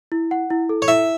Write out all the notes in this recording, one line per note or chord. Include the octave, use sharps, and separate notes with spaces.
E4
F#5
E4
A4
C#5
E4 E5